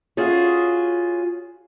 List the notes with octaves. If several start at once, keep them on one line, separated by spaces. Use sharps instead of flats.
C#4 F4 F#4 G#4